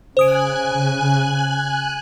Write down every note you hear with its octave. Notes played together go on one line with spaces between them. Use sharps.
C#3 C5 G#5 D#6 F#6 D7